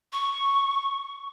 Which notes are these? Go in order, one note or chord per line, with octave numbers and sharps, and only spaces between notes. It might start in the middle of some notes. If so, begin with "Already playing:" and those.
C#6